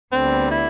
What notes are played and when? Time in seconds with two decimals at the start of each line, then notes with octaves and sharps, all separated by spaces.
0.12 D2 D3 G3 B3 C4
0.51 E4